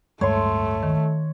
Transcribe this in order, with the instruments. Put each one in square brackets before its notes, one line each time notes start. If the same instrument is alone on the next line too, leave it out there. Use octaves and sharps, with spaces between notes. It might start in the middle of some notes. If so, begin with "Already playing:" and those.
[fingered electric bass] D1 G2 G#3 [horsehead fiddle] A3 [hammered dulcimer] C#5 C6
[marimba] D#3